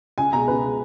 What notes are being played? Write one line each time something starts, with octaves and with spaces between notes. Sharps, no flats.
C#2 G#5
B2 G#3 A#5
C#2 B4
B2 G#3